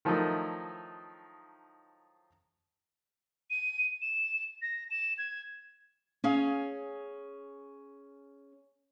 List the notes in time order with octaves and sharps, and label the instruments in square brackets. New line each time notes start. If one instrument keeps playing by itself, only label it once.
[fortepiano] D#3 F3 F#3 A3 D#4 E4
[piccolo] D#7
E7
A#6
E7
G#6
[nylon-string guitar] C#4 G#4 F5